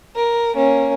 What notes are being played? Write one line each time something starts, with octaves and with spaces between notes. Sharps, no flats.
A#4
A#3 C#4